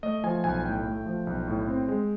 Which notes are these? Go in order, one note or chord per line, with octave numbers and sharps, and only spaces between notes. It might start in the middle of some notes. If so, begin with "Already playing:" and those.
A3 D#5
F3 G#5
B1 G#5
A2 G5
A3
F3
B1
A2
C4
G#3